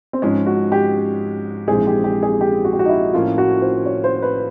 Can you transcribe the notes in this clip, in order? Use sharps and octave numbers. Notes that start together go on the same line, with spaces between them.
C4
G#2 F3 G#3 C#4
F#4
G4
A#1 G#2 E3 G#3 C4 G#4
G4
G4
G#4
G4
F#4
G4
F#4
D#4
E4
A2 F3 A#3 C#4 F4
F#4
C5
C#5
C5
B4